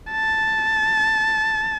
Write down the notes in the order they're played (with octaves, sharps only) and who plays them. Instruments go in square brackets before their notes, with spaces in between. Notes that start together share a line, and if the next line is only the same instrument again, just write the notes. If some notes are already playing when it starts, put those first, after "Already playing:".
[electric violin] A5